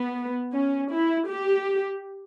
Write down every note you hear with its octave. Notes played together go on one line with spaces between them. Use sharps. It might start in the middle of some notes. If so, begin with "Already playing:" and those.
Already playing: B3
C#4
E4
G4